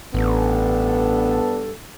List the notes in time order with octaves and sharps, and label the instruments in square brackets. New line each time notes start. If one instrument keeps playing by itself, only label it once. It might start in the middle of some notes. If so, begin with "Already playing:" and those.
[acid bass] A1 [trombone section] G2 D4 A4 [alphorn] B3